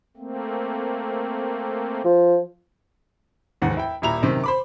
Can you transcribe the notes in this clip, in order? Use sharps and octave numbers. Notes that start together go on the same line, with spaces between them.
A3 A#3 C4
F3
F1 D#2 G#2 F#5
E4 G5
D#1 A#2 E4 A#5 F7
F#2 C3 D#3
C5 B5 D6